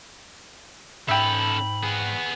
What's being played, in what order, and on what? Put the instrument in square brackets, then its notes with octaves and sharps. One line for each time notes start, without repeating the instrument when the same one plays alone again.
[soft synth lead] G#2 [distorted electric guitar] C#4 A4 [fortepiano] E5 G5 [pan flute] B5
[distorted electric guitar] B3 G#4